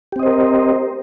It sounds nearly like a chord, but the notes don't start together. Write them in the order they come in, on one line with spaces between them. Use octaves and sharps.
G4 C4 D#5 C5 A#4